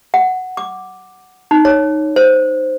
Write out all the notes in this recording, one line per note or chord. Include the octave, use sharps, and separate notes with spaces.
F#5
D6
D#4
C#5
C5